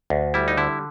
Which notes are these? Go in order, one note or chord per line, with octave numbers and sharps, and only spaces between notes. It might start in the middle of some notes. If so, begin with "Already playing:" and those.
D2
G3 E4
D#4
D3 E4